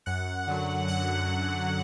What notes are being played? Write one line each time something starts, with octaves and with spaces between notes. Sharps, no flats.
F#2 F#5
D3 F#3
F#2 F#5